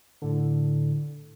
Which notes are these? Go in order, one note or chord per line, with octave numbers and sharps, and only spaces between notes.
A2 D3